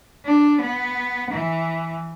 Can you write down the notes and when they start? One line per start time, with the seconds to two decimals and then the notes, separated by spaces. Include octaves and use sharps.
0.25 D4
0.60 B3
1.30 E3